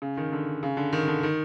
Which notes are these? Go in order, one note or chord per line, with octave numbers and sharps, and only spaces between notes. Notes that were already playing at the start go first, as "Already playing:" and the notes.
C#3
D#3
D3
C#3
D3
D#3
D3
D#3